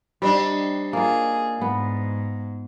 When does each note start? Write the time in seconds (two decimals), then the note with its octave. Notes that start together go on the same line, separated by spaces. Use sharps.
0.22 G3 C4 D4 D#4
0.93 A#3 F4 G#4
1.61 G#2 B3